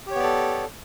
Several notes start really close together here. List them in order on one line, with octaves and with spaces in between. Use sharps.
G4 C#5 B3 D5 A4